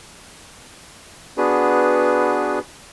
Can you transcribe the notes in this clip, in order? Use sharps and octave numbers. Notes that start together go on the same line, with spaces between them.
B3 D4 F#4 G#4 B4